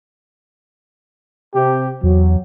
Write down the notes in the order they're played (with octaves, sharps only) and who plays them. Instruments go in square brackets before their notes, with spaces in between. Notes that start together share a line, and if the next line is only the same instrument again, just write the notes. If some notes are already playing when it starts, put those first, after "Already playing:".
[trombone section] C3 G4
[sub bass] E2 [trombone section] F#3